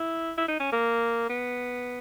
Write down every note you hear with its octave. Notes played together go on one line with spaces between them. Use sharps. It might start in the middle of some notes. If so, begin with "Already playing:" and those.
Already playing: E4
E4
D#4
C#4
A#3
B3